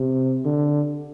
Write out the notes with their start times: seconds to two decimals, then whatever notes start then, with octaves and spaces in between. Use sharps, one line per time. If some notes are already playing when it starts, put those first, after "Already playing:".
Already playing: C3
0.45 D3